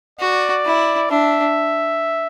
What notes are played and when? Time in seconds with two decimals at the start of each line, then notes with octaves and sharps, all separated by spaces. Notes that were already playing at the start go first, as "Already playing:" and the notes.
0.19 F#4 D5
0.66 E4
1.11 D4 E5